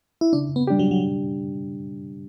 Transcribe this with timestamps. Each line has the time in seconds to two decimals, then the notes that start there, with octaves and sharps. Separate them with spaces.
0.21 E4
0.33 C#3 D4
0.56 B3
0.67 G3 D4 G4
0.79 F#3
0.91 F#3